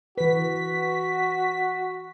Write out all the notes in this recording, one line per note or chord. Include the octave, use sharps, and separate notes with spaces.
E3 F#4 B4 B6